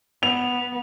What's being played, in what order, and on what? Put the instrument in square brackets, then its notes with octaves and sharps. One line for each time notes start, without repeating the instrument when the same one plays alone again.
[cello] B3 [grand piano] F7